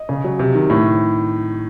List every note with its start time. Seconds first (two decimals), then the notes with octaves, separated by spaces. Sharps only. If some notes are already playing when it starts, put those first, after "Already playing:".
Already playing: D#5
0.09 C#3
0.24 F#3
0.39 C3
0.55 D#3
0.70 A2